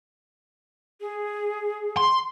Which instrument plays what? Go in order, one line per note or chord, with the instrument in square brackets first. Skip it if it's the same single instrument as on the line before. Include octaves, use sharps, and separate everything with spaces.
[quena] G#4
[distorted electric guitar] C6